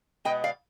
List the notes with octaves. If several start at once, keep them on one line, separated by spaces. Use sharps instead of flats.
B2 G#3 B3 D#5 G5
D5 F5